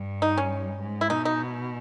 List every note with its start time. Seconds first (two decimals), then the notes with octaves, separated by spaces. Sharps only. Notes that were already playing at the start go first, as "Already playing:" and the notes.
Already playing: G2
0.22 D#4
0.37 C#4
0.81 G#2
1.01 E4
1.10 B2 D#4
1.25 D#4